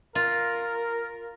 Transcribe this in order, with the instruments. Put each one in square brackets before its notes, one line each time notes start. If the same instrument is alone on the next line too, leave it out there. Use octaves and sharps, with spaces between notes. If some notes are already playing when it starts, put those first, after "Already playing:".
[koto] F4 [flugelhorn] A#4